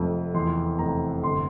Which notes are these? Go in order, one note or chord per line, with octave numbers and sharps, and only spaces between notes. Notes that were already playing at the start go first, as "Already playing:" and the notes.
Already playing: F1 F2
E2 C6
F1 A#5
G1 C6